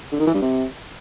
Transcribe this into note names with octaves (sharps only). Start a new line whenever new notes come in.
D3
D#3
E3
G2
C3